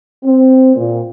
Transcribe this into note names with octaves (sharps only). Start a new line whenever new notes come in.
C4
A#2